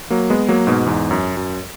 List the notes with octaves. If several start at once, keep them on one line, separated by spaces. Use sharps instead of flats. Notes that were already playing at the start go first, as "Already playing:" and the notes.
F#3 A#3
G#3 B3
F#3 A#3
G#2 B2
E2 G#2
F#2
F#2